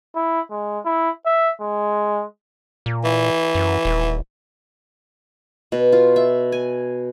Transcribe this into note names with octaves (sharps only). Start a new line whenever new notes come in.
E4
G#3
E4
E5
G#3
A#2
E3
F#2
D#1
B2
F4
E5
G#5